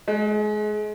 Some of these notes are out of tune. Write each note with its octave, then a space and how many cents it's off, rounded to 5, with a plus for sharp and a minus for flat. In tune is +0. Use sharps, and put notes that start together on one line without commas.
G#3 +30